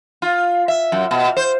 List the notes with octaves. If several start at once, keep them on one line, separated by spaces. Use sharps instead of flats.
F4
E5
F#2
B2
C5